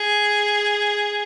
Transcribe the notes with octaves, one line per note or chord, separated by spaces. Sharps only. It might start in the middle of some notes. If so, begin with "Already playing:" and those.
Already playing: G#4